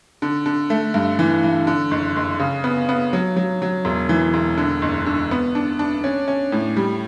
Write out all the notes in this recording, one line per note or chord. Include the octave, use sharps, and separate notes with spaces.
D3
D3
A3
G2
E3
E3
D3
F#1
F#1
C#3
B3
B3
F#3
F#3
F#3
E1
E3
E1
D3
F#1
D3
B3
D4
D4
C#4
C#4
A2
G3